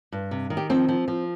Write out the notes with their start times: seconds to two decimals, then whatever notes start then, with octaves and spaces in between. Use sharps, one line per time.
0.12 G2
0.31 C3
0.50 D#3
0.57 G4
0.70 F3 C4
0.88 F3
1.08 F3